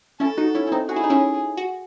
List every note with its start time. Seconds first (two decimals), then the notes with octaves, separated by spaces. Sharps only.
0.20 C#4 E4 A4
0.37 D#4 F#4
0.55 C#4 E4
0.67 E4
0.72 C4 D#4
0.88 F#4 G#4
0.96 E4
1.04 D#4
1.10 C#4 E4
1.57 F#4